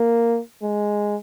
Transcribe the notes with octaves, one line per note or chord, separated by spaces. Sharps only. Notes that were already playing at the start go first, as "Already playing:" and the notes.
Already playing: A#3
G#3